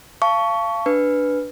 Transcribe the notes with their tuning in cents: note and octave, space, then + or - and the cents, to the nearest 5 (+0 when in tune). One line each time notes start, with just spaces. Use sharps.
F5 -25 A5 +0 C#6 +15
D4 +0 B4 +0